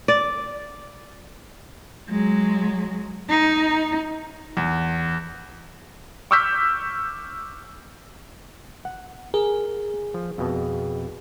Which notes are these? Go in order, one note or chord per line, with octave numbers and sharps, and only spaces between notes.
D5
F#3 G#3
D#4
E2
C#6 D6 E6 F6 G6 B6
F#5
G#4 A#4
F3
F2 B2